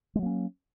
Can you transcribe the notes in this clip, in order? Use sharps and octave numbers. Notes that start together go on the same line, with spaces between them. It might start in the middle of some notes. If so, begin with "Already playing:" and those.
F#3 G#3 A#3 C#4